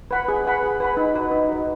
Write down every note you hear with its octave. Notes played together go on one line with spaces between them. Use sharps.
B4 F#5 B5
G#4
B4 F#5 B5
G#4
B4 F#5 B5
D#4
F#4 B4
D#4
F#4 B4